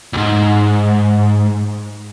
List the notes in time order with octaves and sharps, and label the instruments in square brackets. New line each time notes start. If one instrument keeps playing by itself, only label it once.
[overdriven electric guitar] C#2 G#2